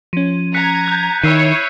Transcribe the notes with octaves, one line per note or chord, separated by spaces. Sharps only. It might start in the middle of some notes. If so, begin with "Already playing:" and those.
F3 C#4 D#7
A#5 F#6 G#6 B6 C#7
F#6 G6
D#3 E4 C#5 E6 C7 D#7